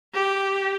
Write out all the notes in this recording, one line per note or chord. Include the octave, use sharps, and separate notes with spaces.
G4